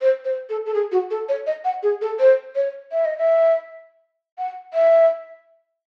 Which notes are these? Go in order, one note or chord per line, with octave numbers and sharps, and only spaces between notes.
C5
C5
A4
A4
G#4
F#4
A4
C#5
D#5
F#5
G#4
A4
C5
C#5
E5
D#5
E5
F#5
E5